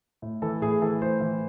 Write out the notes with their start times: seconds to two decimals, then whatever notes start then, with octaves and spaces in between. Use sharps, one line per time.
0.22 A2
0.42 E3 A4
0.62 A2 G#4
0.82 E3 A4
1.02 A2 C5
1.21 E3